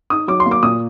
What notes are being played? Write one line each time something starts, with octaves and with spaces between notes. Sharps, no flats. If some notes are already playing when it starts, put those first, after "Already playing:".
D#4 D#6
F#3 D6
C6
A#3
D6
A#2 D#6